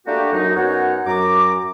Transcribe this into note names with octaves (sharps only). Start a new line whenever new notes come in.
A3 A#3 D4 F#4 G4
F#2 D#4
F#2 F#3 B3 D#4 C#5 F#5
F#2 A#5 D6